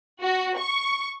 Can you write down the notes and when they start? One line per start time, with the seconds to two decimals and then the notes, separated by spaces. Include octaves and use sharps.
0.21 F#4
0.56 C#6